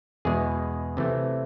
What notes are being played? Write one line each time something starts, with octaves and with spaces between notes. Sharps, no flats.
E2 B2 G#3 G#4
C3 E3 A3